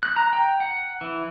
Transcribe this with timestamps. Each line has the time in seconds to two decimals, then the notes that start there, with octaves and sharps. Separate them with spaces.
0.03 F#6
0.16 A#5
0.33 G5
0.60 F#5
1.01 E3